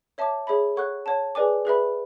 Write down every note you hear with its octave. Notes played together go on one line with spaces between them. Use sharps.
C#5 E5 A5 D6
G#4 C#5 E5 B5
A4 C#5 F#5 C#6 F#6
C#5 F#5 A5
G#4 B4 D5 G#5 D6
G#4 B4 E5 B5